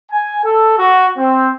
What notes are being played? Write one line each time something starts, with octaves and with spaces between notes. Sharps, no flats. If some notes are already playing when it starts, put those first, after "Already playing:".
G#5
A4
F#4
C4